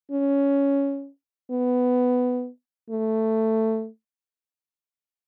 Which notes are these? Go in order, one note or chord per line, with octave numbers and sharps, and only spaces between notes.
C#4
B3
A3